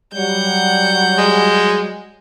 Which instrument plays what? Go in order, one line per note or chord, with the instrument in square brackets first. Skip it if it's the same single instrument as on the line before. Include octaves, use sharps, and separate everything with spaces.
[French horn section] F#3 G3 [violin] F#5 G6
[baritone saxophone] G#3